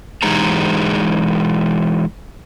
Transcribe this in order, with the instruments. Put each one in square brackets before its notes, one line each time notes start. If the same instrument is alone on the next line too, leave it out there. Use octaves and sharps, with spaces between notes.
[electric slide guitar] E3 G#3 D#4 G4 G#4 A#5